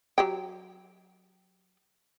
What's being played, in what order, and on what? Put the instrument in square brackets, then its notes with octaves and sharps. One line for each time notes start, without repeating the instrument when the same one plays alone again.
[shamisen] F#3 G4 G5